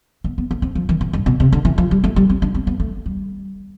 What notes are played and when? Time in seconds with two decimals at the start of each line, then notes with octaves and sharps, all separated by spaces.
0.24 B3
0.38 B3
0.51 B3
0.62 C4
0.75 F3
0.89 E3
1.01 E3
1.13 G2
1.26 B2
1.40 C3
1.53 D3
1.65 E3
1.78 F3
1.91 G3
2.04 A3
2.16 G3
2.30 C4
2.42 D4
2.54 C4
2.67 B3
2.80 A3
3.06 G3